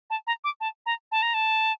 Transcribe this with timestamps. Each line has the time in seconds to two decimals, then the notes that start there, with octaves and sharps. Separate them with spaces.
0.10 A5
0.27 A#5
0.44 D6
0.60 A5
0.86 A#5
1.12 A5
1.23 A#5
1.34 A5